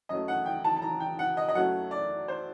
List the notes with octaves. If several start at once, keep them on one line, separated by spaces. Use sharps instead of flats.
F#2 F#3 A3 D#5
F#5
G5
A5
A5
A#5
G5
F#5
D#5
D#5
F#2 F#3 A3 F#5
D5
C5